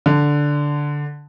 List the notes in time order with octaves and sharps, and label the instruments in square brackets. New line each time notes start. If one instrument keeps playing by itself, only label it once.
[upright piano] D3